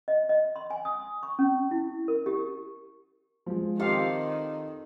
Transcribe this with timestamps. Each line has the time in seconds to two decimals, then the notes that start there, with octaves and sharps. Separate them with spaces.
0.08 D#5
0.29 D#5
0.56 C6
0.70 G#5
0.85 D#6
1.23 C#6
1.39 C#4
1.71 E4
2.08 A#4
2.26 G4
3.46 F3 G#3
3.80 D#3 C4 F4 G4 A4 F5